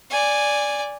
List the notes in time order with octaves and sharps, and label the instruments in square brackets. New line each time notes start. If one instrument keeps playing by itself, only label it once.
[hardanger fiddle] D5 G#5